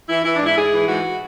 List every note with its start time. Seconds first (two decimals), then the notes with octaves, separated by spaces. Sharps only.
0.09 E3 E4
0.24 E3 E4
0.36 D4
0.40 G#2
0.46 E4
0.57 G#2 G#4
0.72 E3
0.88 G#2 F#4